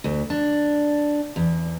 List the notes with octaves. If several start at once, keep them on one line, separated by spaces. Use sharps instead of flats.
D2
D4
E2